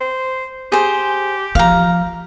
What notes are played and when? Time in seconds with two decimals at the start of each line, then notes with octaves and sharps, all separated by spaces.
0.01 C5
0.72 G4 G#4 C5
1.55 F3 F5 A#5